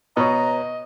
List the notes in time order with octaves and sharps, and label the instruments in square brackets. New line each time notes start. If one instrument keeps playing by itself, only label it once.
[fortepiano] B2 [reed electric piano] B4 C#5 [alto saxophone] D#5 [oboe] A#5